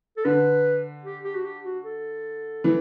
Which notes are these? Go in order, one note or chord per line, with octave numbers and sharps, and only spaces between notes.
A4
D3 B4
G4
G4
F#4
G4
F#4
A4
E3